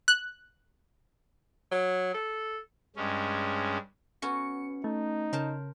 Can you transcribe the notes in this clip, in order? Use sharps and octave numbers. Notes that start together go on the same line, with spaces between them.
F#6
F#3
A4
G2 G#3 C#4
B3 C#4 F#4 C#7
A3 D#4
C#3 A#4 C5 A5